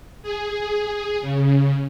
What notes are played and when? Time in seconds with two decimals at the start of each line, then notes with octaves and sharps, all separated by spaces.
0.23 G#4
1.21 C#3